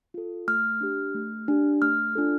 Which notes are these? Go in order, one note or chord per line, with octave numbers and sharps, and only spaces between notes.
F4 A4
A3 F6
D4 G4
A3
D4 G4
A3 F6
D4 F4 A4